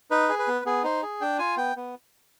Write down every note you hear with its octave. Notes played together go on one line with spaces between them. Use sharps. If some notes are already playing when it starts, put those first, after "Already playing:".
D#4 B4
G#4
B4
B3
B3 G#4
D#4 C5
G#4
D4 G5
F4 G#5
B3 G5
B3